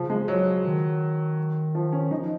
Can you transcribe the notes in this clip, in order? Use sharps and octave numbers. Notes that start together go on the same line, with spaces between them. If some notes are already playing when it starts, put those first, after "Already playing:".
Already playing: C#3 F3
G#3
F#3
D#3
F3
C#4
F3 D#4